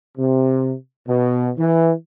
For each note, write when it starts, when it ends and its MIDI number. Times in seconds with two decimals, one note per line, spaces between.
0.17 0.74 48
1.08 1.50 47
1.58 1.91 52